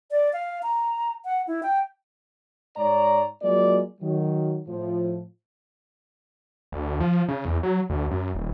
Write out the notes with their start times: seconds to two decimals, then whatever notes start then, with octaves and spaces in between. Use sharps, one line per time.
0.11 D5
0.33 F5
0.63 A#5
1.25 F#5
1.47 E4
1.63 G5
2.77 G#2 C#5 D5 A#5
3.42 F#3 G#3 A#3 F4 D5
4.01 D#3 F#3
4.66 A2 F3
6.72 D2
7.00 F3
7.28 C#3
7.45 E2
7.63 F#3
7.90 D2
8.11 F#2
8.35 D#1